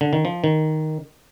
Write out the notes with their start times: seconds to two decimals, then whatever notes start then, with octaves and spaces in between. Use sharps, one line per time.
0.01 D3
0.13 D#3
0.25 F3
0.44 D#3